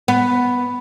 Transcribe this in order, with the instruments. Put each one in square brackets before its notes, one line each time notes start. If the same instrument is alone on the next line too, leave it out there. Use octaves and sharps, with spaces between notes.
[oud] B3